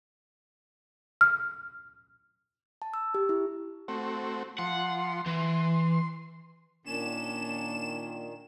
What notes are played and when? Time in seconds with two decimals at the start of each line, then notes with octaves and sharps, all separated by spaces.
1.21 F6
2.82 A5
2.94 E6
3.14 G4
3.29 E4
3.88 A3 C4 F#4
4.59 F3 F#5 C6
5.27 E3 C6
6.85 A#2 D#3 A#3 C#4 D4 E7